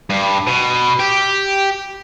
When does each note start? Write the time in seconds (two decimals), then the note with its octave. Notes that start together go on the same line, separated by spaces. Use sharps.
0.10 G2
0.47 B2
1.00 G4